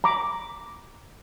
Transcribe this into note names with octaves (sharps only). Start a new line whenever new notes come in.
A#5 B5 D6